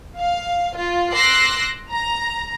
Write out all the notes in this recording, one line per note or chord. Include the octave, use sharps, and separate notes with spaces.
F5
F4
C6 D6 E6 F#6 A#6 C7
A#5